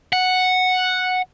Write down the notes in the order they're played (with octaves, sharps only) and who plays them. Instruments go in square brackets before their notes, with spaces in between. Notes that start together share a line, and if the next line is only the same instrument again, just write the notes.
[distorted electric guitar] F#5